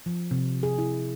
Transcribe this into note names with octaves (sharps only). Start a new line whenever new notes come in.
F3
C3
G#4
E4